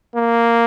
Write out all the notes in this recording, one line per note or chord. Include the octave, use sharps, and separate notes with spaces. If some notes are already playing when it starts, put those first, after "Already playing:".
A#3